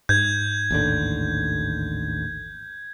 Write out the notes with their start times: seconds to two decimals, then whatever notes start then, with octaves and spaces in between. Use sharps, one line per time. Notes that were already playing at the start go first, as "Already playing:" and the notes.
0.09 G#2 G6 G#6
0.71 A1 D#2 D3